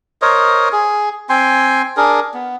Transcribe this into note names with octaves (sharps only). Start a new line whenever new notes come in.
A#4 C5 C#5 D#5
G#4
C4 G5 G#5 C6
D4 G#4 A#4
B3